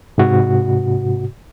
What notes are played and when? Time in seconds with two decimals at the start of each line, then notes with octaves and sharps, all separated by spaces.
0.18 G#2 C3 F#4